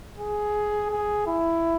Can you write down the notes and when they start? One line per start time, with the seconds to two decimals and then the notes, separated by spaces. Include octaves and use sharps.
0.18 G#4
0.91 G#4
1.27 E4